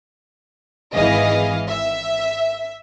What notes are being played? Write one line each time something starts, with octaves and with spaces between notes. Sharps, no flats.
G#1 E3 G#4 D#5 F5
E5